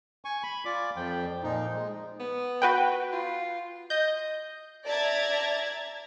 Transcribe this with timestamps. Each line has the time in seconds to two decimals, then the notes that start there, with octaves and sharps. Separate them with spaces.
0.25 G#5 C#6
0.43 B5
0.65 F4 D5 D6
0.96 F2 F3 G5
1.43 A#2 F3 D#4
1.73 G#3
2.19 B3
2.62 F#4 B4 G5
3.12 F4
3.90 D#5 G6
4.85 D5 E5 A5 A#5 G#6 A6